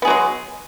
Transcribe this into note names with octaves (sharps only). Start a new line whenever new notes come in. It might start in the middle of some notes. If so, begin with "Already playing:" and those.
F#3 G#3 B3 G#4